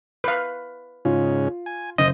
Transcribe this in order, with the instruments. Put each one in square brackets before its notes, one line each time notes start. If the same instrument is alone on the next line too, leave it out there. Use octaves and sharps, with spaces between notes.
[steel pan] B4 F5
[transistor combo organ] G#2 C#3 C#4 [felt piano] F4
[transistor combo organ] G#5
[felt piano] F#1 [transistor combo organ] C5 [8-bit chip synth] D#5